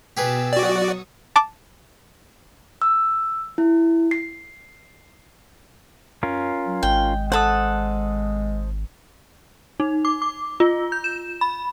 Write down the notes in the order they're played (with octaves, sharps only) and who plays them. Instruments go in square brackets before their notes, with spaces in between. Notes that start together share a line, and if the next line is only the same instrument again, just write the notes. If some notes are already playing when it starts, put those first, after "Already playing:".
[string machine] B2 E6 A6 [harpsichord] G4 G#4 B4
[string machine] F#3 C#6 D#6 [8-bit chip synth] F#4 D5
[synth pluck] A5 D6
[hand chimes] E6
E4
C7
[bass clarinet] F#2 [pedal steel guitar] C#4 F4 A#4
[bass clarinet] F#3
[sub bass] G#1 [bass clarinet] G#3 [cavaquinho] G5
[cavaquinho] A4 F#5 [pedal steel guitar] C5 A5 D#6
[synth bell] D#4
D6
D6
F4
G6
E7
B5